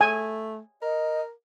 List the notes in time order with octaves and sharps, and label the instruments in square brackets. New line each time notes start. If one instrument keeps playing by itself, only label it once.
[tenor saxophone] A3 [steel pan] G#5
[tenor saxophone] A#4 [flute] D#5